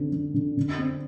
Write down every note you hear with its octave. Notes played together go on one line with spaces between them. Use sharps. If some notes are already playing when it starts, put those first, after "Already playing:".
Already playing: D3 C4
D3
D3
D3
C4